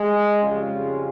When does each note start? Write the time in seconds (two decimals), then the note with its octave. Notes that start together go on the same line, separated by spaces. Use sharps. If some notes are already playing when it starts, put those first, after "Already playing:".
Already playing: G#3
0.40 F2 C#3 G3 C#4 F4